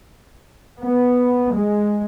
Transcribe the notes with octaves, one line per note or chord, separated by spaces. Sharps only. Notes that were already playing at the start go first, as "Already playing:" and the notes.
B3
G#3